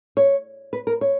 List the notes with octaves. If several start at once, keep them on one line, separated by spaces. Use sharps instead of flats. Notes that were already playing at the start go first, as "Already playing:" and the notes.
C#5
B4
A#4
C#5